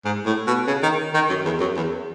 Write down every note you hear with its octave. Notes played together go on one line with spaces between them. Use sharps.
G#2
A2
B2
C#3
D#3
D#3
F#2
E2
F#2
E2